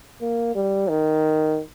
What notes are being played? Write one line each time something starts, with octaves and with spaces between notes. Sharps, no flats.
A#3
G3
D#3